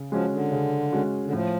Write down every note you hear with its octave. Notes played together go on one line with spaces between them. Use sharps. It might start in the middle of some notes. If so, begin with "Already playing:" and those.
Already playing: C#3
F3 G#3 C#4 F#4
D3
C#3
G#3 C#4 F#4
D3
A2 F3